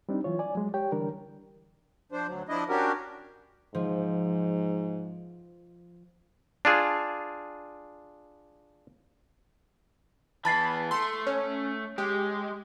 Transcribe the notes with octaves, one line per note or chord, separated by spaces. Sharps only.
G3 C4 D4 D#4
E3 F#3 F4 C#5
D5 G#5
F#3 G#3
G4 C#5 G5
D3 E3 G3 D4 A#4
F3 D4 C5
D2 F#3
F3 D4 E4 D#5
C#4 D4 F#4 G4 A#4
G#2 F3
D4 F4 G#4
E3 B3 A5 B5 A6 C7
A3 C6
C#4 C#5
G#3 G4